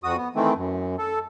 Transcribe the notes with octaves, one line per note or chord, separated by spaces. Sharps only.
F2 F#4 D#6
B3
D#3 E3 A3 C4
F#2
A4